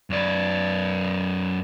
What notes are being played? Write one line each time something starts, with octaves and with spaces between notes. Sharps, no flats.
F#2 D5